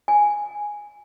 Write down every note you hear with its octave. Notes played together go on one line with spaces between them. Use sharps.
G#5